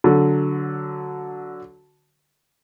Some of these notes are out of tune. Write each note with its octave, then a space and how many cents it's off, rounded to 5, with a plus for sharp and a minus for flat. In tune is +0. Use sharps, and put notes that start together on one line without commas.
D3 -10 F#3 +0